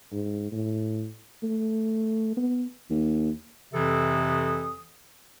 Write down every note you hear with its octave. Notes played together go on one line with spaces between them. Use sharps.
G#2
A2
A3
B3
D#2
F2 C3 E3 A4 D#6